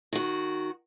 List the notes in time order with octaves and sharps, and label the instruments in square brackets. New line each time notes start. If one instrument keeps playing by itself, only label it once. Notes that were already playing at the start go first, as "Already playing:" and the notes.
[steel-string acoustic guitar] D#3 F#4